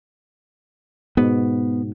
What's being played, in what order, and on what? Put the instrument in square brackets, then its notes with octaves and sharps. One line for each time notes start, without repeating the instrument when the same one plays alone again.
[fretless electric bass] G#2 B2 [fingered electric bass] B3